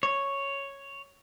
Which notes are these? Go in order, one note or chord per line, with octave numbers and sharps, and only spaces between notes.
C#5